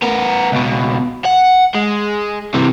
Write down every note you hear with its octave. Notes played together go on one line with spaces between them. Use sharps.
B3 A#4
C#2 B2
F#5
G#3
C3 E3